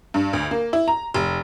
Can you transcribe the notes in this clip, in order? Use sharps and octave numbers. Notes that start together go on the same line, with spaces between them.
G2
D2
A#3
E4
A#5
F1